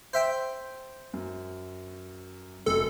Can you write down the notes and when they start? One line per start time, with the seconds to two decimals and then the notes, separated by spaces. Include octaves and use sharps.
0.13 C5 E5 G5
1.13 F#2
2.66 F1 F#2 A4